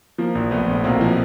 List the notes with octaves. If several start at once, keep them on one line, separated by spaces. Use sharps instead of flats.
F3 A#3
A#1
A#1 A3 B3
A#1
B1 A#3 C4
F3